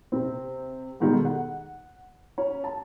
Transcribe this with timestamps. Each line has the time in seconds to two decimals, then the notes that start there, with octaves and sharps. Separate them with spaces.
0.12 C3 C4
1.00 G#2 B2 D#3 G3 A3
1.25 F#5
2.38 C#4
2.64 A5